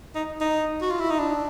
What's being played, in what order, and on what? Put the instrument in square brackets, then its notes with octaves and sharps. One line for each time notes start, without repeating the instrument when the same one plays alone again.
[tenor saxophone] D#4
D#4
F#4
F4
E4
D#4
D4